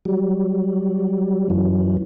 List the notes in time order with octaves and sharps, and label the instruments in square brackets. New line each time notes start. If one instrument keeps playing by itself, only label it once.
[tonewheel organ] F#3 G3
F#2 E3 F#3